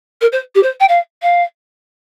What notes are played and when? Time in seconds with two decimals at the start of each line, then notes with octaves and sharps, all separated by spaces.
0.21 A#4
0.32 C5
0.55 G4
0.63 C5
0.80 G5
0.88 F5
1.22 F5